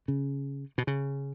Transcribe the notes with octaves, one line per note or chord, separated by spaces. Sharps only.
C#3
B2
C#3